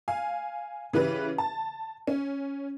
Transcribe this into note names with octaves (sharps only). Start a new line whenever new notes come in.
F5 G#5
C#3 E3 G4 B4
A5
C#4